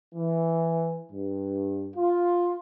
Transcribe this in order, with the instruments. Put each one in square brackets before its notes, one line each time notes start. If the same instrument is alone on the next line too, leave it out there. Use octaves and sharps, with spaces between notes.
[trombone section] E3
G2
F4